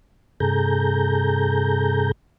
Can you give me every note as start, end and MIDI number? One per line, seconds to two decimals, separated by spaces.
0.40 2.12 43
0.40 2.12 48
0.40 2.12 68
0.40 2.12 69
0.40 2.12 82
0.40 2.12 91